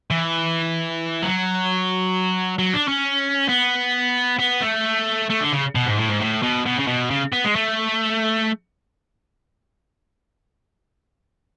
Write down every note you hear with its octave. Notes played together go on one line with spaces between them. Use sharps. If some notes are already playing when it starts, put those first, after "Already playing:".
E3
F#3
F#3
D4
C#4
B3
B3
A3
A3
D3
C#3
B2
G#2
A2
G#2
A2
B2
B2
C#3
B2
C#3
B3
G#3
A3